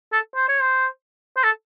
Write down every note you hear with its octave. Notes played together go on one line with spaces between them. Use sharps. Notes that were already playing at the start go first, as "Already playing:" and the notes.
A4
C5
C#5
C5
C5
A4